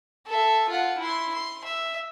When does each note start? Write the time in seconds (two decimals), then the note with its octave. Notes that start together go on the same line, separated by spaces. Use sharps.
0.26 A4 E5
0.69 F4 F#5
0.98 E4 C6
1.34 C6
1.65 E5